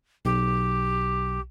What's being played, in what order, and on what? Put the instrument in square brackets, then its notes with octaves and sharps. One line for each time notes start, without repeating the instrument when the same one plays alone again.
[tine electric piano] B1 [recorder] G4